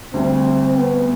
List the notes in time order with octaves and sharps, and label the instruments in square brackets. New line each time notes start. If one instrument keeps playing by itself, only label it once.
[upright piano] D2 D3 G3 [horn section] C4
[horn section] B3